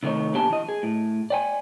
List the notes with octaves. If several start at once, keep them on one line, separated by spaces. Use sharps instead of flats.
C3 D#3 A3 D#4 C#5
B2 A#3 D4 G4 G#5 A5
E3 D#5
G#4
A2
D5 G5 G#5